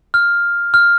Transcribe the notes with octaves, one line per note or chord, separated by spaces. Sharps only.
F6
F6